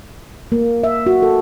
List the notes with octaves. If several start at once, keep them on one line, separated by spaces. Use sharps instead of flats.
A#3
E5
F#4
A4